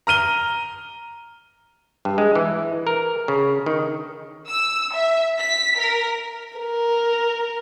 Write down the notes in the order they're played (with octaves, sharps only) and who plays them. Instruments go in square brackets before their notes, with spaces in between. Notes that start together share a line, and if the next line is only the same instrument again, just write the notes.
[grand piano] A#5 F6 D#7 G7
[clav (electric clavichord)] G2
G#3
E3
A#4
C#3
D#3
[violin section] E6
E5
B6
A#4
[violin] A#4